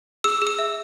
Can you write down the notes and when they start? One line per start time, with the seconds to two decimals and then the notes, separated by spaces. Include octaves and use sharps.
0.24 G#4 E6
0.42 G#4
0.47 E6
0.59 E5